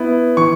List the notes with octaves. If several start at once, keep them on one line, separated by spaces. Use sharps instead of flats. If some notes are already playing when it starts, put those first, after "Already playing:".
Already playing: B3 E4
E3 C#6